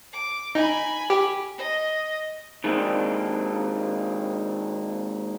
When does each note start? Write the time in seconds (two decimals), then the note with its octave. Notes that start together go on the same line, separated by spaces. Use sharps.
0.13 D6
0.55 D#4 G#5 B5
1.10 G4
1.58 D#5
2.64 D#3 G#3 A#3 C4 D4 A4